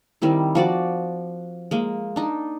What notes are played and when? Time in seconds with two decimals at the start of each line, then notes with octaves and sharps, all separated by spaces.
0.22 D#3 G3 C4 E4
0.55 F3 F#4 D5
1.71 G#3 A#3
2.16 D4 D#4